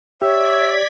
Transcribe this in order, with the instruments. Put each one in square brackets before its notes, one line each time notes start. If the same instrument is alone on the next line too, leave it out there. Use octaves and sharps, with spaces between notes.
[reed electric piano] G4 [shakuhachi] C#5 [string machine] D5 G#6 B6 [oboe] E5